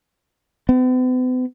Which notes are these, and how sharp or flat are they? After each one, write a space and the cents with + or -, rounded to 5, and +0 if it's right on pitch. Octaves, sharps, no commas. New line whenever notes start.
B3 +45